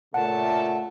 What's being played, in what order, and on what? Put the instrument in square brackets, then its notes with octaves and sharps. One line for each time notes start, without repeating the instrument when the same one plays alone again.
[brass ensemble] A#2 C#3 A3 [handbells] F#5 [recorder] A5